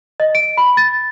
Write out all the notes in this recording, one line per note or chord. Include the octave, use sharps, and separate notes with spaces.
D#5
D7
B5
A6